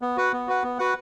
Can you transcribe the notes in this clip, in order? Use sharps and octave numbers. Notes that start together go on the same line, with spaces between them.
B3
F#4 B4 F#5
B3
F#4 B4 F#5
B3
F#4 B4 F#5